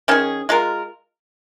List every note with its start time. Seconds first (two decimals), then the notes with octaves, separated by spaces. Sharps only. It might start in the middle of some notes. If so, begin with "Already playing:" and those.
0.08 D#3 C#4 F4 G#4
0.49 G#3 F4 A#4